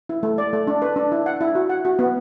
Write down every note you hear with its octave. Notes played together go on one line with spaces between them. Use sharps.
E4
A3
D5
A3
D4
B4
D4
E4
F#5
E4
F#4
F#5
F#4
B3